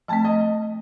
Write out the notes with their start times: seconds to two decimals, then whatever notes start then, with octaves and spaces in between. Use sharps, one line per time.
0.08 F3 A3 C4 A5
0.25 D#5